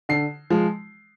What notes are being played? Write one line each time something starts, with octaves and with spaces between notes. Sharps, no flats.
D3 C7
F3 G#3